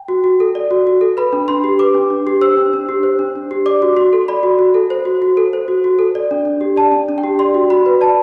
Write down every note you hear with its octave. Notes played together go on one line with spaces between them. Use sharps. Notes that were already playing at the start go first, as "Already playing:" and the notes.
Already playing: G5
F#4
F#4
A4
D5
F#4
F#4
A4
B4 B5
D4
D4 C6
G4
B4 D6
D4
D4
G4
C5 E6
D4
D4
G4
C5
D4
D4
G4
D5 D6
F#4
F#4 C6
A4
D5 B5
F#4
F#4
A4
C5
F#4
F#4
A4
C5
F#4
F#4
A4
D5
D4
D4
G4
D5 A5
D4
D4
G5
G4
D5 C6
F#4
F#4 B5
B4
D5 A5